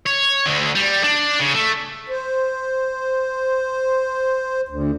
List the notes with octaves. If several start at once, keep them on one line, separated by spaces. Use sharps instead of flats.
C#5
D2 D3
G3
D4
C#3
A3
C5
D2